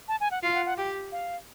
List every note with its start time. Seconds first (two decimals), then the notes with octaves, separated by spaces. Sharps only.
0.08 A5
0.20 G#5
0.31 F#5
0.43 F4 F5
0.54 F#5
0.66 F#5
0.78 G4 G5
1.12 F5